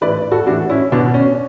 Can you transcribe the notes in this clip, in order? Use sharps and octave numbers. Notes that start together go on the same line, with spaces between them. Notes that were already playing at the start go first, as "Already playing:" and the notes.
A2 E3 B4 D5
F#4 A4
A2 E3 D4 F#4
C#4 E4
B2 B3 D4
C#4